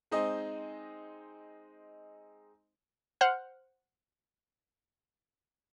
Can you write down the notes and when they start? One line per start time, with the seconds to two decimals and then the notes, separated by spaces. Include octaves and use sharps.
0.11 G#3 C4 D#4 C5 D#5
3.21 C5 F#5 F6 G6